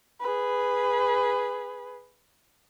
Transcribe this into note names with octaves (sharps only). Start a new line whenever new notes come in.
G#4 B4